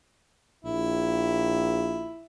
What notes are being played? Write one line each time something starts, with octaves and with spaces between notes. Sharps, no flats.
A#1 E4